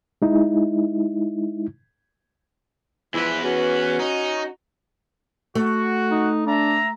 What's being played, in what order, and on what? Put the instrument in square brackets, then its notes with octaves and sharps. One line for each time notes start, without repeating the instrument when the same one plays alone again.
[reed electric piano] G#3 D#4 E4
[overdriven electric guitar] E2 B4 [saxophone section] F3 E4
[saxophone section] C#4 F#4
[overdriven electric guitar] D#4
[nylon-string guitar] A3 [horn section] F#4
[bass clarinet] D#4
[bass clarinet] D4 [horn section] E5 A#5